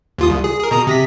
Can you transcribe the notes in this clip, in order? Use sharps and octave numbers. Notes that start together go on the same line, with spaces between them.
D#2 F4 D#6
C2
G#4
G#4 A#4
B2 A#5 D#6
C3 A#6 B6